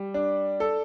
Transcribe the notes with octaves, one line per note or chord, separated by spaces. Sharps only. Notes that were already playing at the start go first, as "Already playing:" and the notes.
Already playing: G3
D4
A4